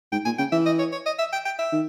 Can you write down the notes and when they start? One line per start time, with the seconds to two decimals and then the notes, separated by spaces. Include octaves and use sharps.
0.12 G#2 G5
0.25 A#2 G#5
0.38 C#3 G5
0.52 E3 E5
0.66 D#5
0.79 C#5
0.92 C#5
1.06 D#5
1.19 E5
1.33 G5
1.45 G5
1.59 E5
1.72 D#3